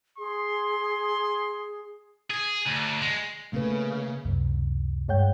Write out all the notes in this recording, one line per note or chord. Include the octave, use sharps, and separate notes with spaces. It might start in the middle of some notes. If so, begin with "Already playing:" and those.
G#4 C6
G#4
D2
G#3
C#3 A3 A#3 B4
C#2 F#2 C3
G2 G#3 C#5 F#5 G5 G6